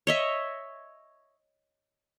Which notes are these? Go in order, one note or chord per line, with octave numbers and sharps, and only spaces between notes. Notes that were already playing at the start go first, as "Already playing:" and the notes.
C#5 D#5 E5